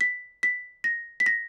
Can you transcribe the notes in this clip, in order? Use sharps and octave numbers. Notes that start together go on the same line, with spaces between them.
B6
B6
A#6
B6
A#6